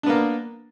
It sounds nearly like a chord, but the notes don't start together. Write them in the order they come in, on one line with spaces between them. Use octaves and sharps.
D4 B3 A#3